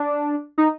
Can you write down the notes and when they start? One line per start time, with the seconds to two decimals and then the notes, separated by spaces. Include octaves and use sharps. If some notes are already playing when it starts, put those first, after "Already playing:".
Already playing: D4
0.58 D#4